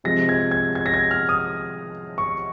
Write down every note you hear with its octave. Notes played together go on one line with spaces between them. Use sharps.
C3 F3 G#3 A#6
G#6
G#6
G#6
A#6
G#6
F6
D#6
C#6